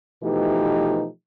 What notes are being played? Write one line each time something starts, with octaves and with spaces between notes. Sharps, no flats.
B2 E3 F3 A3 D#4 G4